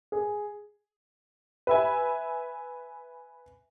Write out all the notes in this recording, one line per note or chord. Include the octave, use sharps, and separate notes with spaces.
G#4
B4 E5 G#5